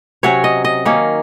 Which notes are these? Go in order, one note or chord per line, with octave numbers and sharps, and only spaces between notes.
C3 F#3 C#4 C#5
D#5
D#5
D#3 A#3 C#4